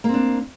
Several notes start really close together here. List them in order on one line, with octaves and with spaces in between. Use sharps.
A#3 C4 D4